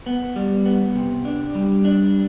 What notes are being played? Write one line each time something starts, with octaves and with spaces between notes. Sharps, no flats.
B3
G3
B3
C3
D4
G3
D4